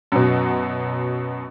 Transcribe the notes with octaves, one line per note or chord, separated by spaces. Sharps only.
F#2 B2